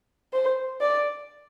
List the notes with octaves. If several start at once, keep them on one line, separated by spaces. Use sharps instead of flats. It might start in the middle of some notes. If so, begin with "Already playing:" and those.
C5
D5